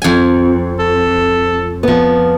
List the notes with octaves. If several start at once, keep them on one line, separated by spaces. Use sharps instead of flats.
F2 G#5
A4
F3 B3